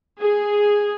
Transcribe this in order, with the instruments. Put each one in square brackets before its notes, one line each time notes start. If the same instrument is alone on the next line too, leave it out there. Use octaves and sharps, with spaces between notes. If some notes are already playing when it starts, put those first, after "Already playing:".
[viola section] G#4